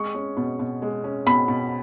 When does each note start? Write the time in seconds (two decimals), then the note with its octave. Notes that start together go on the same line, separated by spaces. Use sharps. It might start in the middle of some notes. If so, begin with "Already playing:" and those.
Already playing: G#3 C#6
0.15 C#4
0.37 B2
0.59 B2
0.82 G#3
1.04 C#4
1.26 B2 B5
1.48 B2